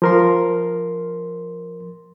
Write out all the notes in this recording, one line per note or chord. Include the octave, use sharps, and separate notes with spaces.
F3 A#4 C6